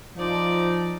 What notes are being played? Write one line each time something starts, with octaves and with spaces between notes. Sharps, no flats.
F3 D#4 D5